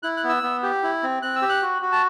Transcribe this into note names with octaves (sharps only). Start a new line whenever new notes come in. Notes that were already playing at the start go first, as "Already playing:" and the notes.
E4 F#6
F#6
B3
E6
B3
G4
E4
C4
C4 F#6
E6
G4
F#6
F#4
F#4
A5